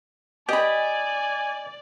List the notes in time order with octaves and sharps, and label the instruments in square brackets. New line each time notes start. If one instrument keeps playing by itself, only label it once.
[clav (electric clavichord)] G4 [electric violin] D5 [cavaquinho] D#5 B5 [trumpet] G#5